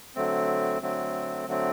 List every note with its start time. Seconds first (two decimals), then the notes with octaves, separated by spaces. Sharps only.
0.15 D3 F#3 A3 C4
0.82 D3 F#3 A3 C4
1.47 D3 F#3 A3 C4